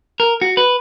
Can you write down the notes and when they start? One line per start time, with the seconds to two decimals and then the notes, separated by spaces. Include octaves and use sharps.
0.20 A#4
0.41 F#4
0.57 B4